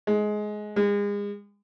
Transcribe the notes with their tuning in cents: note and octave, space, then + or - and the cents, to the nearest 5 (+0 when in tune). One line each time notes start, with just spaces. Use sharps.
G#3 +15
G#3 -35